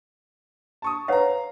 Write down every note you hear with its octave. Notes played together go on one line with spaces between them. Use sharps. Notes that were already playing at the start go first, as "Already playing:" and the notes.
A5 C#6 D#6
B4 C#5 F5 F#5 A#5